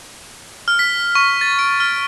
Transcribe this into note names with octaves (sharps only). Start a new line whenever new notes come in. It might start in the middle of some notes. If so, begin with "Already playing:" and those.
F6
B6
C#6
A6
D7
F6